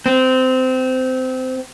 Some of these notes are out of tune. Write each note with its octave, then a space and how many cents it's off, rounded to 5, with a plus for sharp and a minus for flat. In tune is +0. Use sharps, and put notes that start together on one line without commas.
C4 -20